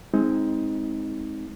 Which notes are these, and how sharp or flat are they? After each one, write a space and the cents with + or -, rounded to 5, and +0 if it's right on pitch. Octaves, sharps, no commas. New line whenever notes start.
G#3 +0 C4 +10 D#4 +25